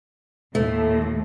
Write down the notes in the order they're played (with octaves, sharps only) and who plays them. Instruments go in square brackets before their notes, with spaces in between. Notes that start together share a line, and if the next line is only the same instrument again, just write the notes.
[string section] D#2 A2 [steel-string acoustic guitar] A3